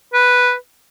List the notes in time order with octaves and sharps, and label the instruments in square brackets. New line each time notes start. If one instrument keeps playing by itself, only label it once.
[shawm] B4